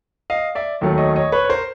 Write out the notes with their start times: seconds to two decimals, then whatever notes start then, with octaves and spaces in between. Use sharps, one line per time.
0.30 D#5 F5
0.55 D5 E5
0.81 D#2 D#3 F#3 A3
0.98 C#5 D#5
1.16 C#5 D#5
1.32 B4 C#5
1.44 C#5
1.49 A#4 C5